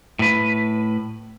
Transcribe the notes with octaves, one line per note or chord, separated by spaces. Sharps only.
A2 B4